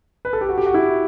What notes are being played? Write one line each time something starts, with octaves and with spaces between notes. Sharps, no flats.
B4
A4
G4
F#4
G4
F#4
E4